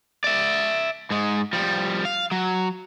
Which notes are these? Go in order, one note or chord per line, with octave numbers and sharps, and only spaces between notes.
D5 E5
G#2 G#3
F3 G3
F5
F#3